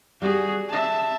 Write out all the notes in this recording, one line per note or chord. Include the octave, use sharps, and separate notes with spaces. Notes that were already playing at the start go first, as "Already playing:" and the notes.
G3 F#4 G#4
E5 A5